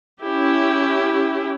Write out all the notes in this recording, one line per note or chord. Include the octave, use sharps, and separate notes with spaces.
C#4 E4 G4